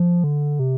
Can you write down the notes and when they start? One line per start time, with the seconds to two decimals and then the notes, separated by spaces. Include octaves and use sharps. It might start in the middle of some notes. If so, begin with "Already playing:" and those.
Already playing: F3
0.24 D3
0.59 C3